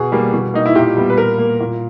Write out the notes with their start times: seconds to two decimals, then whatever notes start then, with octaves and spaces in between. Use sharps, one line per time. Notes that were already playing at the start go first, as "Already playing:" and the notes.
Already playing: B2 G#4
0.12 G3 A#3
0.33 B2
0.54 A#3 D#4
0.66 E4
0.75 A#2 G4
0.97 G3 B3
1.10 B4
1.17 A#2 A#4
1.38 A#3
1.60 A#2